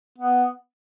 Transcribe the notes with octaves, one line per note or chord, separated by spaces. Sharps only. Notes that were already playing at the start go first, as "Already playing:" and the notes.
B3